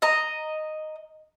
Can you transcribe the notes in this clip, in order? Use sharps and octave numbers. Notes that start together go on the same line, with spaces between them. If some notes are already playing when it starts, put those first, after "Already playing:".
D#5 A#5